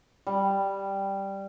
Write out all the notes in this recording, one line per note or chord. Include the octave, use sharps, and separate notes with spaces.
G3